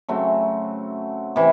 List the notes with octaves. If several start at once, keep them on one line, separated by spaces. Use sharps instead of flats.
C#3 F#3 A3 C4
C3 E3